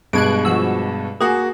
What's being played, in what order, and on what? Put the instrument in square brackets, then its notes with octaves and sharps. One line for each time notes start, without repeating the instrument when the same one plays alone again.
[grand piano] G2 B2 G#3 [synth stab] F#6 G#6 D7
[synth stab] F3 F#4 E6
[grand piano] A#3 F#4 [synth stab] G#4